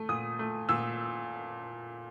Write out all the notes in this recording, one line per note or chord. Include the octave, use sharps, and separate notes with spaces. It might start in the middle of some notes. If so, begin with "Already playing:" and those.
Already playing: A3
A#2 D#6
A3
A#2 E6